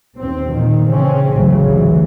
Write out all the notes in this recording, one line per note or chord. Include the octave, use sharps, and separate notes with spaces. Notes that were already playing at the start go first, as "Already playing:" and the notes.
D#2 C4
A#2 D#3
C#3 E3 C4 C#4
A1 D2 G#2 C#3 E3 F#3
A1 D2 A2 E3